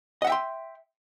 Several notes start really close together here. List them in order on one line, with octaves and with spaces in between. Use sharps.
D#5 F#5 E5 G5 C6